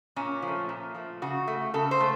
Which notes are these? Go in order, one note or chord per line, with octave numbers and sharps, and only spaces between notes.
A#2 C#4
F3
A3
A#2
F3 A3
C#3 F#4
A3
C#3 A4
C5
A3